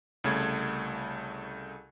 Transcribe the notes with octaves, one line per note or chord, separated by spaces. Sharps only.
C2 C#3 A3 G#6